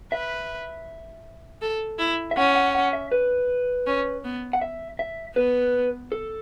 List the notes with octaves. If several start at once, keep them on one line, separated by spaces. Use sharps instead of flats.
B4 E5
A4
E4
E5
C#4 F#5
F#5
F#5
E5
B4
C#4
B3
F#5
E5
E5
B3 B4
A4